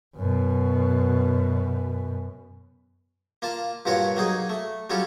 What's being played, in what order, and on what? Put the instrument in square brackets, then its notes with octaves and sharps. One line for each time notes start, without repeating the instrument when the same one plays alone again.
[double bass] F#2 B2
[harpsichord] A#3 F4 A5
G2 A#2 F4 F#4 C#5
F#3 A#3 D#4 G#4
A3
F#3 G3 C#4 F4 A4